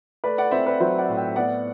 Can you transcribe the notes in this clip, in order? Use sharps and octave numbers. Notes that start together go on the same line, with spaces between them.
A3 B4 D5
D5 F#5
C4 C5 E5
B4 D5
F#3 C5 E5
D5 F#5
A2
E5 G5
B3 D5 F#5